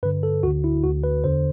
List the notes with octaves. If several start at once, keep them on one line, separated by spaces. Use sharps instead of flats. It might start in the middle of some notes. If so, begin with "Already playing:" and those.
G2 D3 B4
A4
D2 D3 F#4
E4
D2 D3 F#4
B4
E2 D3 C5